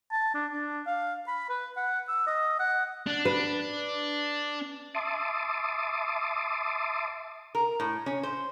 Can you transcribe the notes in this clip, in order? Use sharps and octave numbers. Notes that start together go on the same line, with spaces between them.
A5
D4
D4
F5
B5
B4
F#5
E6
D#5
F#5
D4
B4
E5 A5 C6 D6 D#6
A#4
A2
C#4
C5